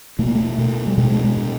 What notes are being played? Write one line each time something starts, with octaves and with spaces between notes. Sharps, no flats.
B2 A3
A#3
A3
B2
G3
B2 G#3
G#3
G#3
B2